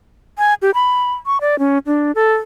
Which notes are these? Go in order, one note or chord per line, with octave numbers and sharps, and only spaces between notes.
G#5
G4
B5
C#6
D5
C#4
D4
A4